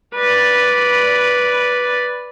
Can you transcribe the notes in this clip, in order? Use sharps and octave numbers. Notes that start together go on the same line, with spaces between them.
B4 D5